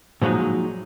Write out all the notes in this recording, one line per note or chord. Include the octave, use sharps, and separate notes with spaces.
A#2 F3 F#3 G#3 D#4